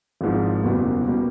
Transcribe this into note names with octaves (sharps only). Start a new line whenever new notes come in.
G#1 G#2 F3
F#1 E2 B2 G3 A#3
B2 G3 A#3